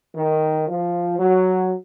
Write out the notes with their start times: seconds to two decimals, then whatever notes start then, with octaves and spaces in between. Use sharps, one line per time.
0.16 D#3
0.68 F3
1.19 F#3